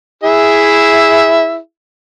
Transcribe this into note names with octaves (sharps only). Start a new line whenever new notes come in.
E4 G#4 E5